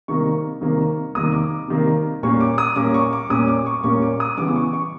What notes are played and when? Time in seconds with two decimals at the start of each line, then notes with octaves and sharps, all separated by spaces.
0.08 C3 D#3 G3 A#3 C#6
0.61 C3 D#3 G3 A#3
1.15 C3 D#3 G3 A#3 D#6
1.33 D6
1.68 C3 D#3 G3 A#3
2.23 A#2 G3 A#3 C#4 C#6
2.40 D6
2.58 D#6
2.76 A#2 G3 A#3 C#4 D6
2.94 C#6
3.13 D6
3.30 A#2 G3 A#3 C#4 D#6
3.48 D6
3.66 C#6
3.84 A#2 G3 A#3 C#4 C#6
4.02 D6
4.20 D#6
4.37 C#3 E3 G3 B3 D6
4.48 D6
4.56 C#6
4.73 C#6